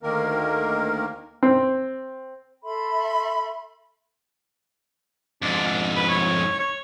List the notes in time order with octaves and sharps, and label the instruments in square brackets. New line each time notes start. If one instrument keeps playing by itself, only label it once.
[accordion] D2 D#3 A#3 A#4
[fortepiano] C4
[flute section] A4 E5 B5 C6
[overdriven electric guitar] F2 G#2 [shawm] D4
[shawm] B4
C#5
C#5